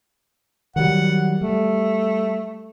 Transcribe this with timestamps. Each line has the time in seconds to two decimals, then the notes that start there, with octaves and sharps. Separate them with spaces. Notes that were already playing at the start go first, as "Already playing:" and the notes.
0.76 D#3 F#3 G3 F#5
1.41 G3 A3